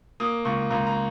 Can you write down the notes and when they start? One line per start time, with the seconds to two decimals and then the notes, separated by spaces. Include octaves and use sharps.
0.20 A#3 D#6
0.45 C#2 C#6
0.70 C#2 A#5
0.87 A#5